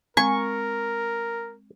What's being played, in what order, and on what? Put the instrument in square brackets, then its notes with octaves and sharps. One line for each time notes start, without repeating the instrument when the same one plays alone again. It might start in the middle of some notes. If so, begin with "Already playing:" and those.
[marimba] G#3 C4 [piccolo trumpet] A#4 [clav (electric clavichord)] G#5 [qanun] C#6